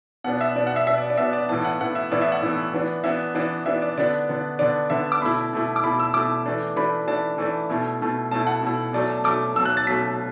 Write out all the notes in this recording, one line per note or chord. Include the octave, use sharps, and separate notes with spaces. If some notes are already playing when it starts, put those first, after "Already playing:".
B2 B3 D4 F#5
E5
B2 B3 D4 D5
F#5
E5
B2 B3 D4 E5
D5
D5
B2 B3 D4 E5
D5
A2 E3 B3 E4 A5
F#5
A2 E3 B3 E4 F#5
E5
A2 E3 B3 E4 D5
E5
F#5
A2 E3 B3 E4
E3 B3 D4
E3 B3 D4 E5
E3 B3 D4 D5
E3 B3 D4 E5
D5
D3 B3 D4 D5
D3 B3 D4
D3 B3 D4 D5
D3 B3 D4 E5
D6
B2 A3 E4 B5
B2 A3 E4
D6
B2 A3 E4 B5
E6
B2 A3 E4 D6
E3 A3 D4
E3 A3 D4 B5
E3 A3 D4 A5
E3 A3 D4
B2 A3 E4
B2 A3 E4
B2 A3 E4 A5
F#5
B2 A3 E4
B2 F#3 A3 D5
A5
B2 F#3 A3 D6
B2 F#3 A3 E6
F#6
A6
B2 F#3 A3 B6